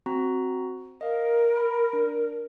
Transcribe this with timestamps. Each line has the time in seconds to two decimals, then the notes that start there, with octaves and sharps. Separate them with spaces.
0.06 C4 F#4 A#5
1.01 A#4 D#5 F5
1.57 B5
1.93 D4